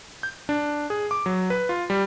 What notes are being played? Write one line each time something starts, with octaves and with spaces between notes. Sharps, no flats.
G6
D4
G#4
D6
F#3
B4
F4
G3